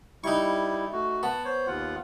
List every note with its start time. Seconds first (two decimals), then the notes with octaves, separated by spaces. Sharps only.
0.24 G3 D#4 E4 C#6
0.93 A3 F#4
1.23 B3 F#5 A5
1.45 C5 C#5
1.67 D#2 F4 F#5